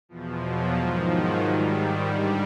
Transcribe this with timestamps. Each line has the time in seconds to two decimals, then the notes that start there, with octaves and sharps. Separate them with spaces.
0.09 E2 B2 F3
0.42 F#3
0.75 G#2 D#3 F3
1.09 F#3
1.42 G#2 D#3 G3
1.75 G3
2.09 G2 D3